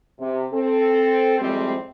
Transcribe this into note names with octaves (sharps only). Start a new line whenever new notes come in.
C3
C4 A4
F2 A2 G3 G#3 C4